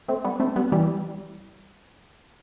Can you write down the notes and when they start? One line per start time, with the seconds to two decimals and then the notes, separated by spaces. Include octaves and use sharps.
0.08 A3 C4
0.24 G3 B3
0.40 A3 C4
0.56 G3 B3
0.72 E3 G3